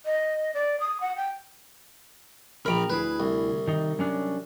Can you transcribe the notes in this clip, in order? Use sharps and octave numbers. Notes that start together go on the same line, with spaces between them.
D#5
D5
D#6
F#5
G5
A#1 A#4 G5 A#5 B5
D2 E4 G#4 B4
C2
D#3 D#4
F#3 C#4 D4